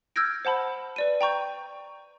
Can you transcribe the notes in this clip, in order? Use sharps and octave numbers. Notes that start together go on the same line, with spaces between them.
E6 F6 G6 G#6 A#6 D7
C5 F#5 A5 B5
B4 D5 D#7
G5 A#5 C#6 G6